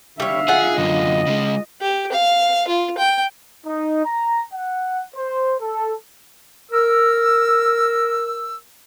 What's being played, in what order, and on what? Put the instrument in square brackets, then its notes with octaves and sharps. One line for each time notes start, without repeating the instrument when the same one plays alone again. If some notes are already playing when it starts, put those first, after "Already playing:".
[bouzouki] G3 C#5 [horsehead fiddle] E5 F5
[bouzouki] D#4 F4 F#5 [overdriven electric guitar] G#4
[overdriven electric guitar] F#2 D3 [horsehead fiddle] D#5
[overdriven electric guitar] C#3 G#3
[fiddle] G4
F5
F4
G5
[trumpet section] D#4
A#5
F#5
C5
A4
[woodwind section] A#4 E6